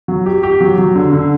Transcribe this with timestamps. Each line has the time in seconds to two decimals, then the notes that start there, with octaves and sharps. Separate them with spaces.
0.08 F#3
0.26 G4
0.43 G4
0.61 F#3
0.78 F#3
0.95 D3
1.13 D3